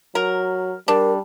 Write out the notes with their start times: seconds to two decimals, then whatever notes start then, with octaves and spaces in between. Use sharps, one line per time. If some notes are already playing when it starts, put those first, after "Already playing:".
0.15 F#3 A#4
0.88 G3 D4 A#4